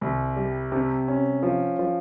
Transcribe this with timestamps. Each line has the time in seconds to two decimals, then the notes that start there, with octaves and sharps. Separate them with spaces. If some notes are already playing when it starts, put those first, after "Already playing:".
0.01 C2
0.37 G3
0.72 C3
1.08 C#4
1.43 F3
1.79 F3